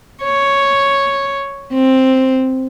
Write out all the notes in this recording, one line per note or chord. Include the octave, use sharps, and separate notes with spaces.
C#5
C4